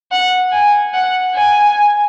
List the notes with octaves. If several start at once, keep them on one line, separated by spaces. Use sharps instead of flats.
F#5
G#5
F#5
G#5